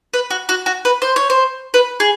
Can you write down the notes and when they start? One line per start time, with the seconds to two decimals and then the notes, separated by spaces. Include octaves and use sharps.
0.14 B4
0.31 F#4
0.49 F#4
0.66 F#4
0.85 B4
1.02 C5
1.16 C#5
1.30 C5
1.74 B4
2.00 G#4